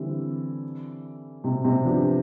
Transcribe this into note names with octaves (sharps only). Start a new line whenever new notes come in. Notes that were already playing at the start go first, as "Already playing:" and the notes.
Already playing: D3 E3 G3 C4 E4
C3
C3
F3 B3 D4 G4